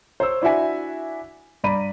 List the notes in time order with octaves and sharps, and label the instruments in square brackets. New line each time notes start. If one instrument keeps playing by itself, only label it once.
[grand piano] C5 C#5 E6
D4 E4 F#4 E5 G#5
G2 D5 A#5 B5 D#7